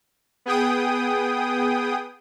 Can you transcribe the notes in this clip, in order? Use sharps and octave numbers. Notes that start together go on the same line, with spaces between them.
B3 G#4 G5 D#6